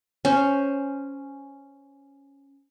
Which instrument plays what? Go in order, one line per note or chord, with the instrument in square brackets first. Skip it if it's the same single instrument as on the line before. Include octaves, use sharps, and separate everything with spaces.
[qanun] C#4 C5